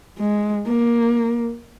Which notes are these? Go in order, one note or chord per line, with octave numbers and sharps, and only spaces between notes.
G#3
A#3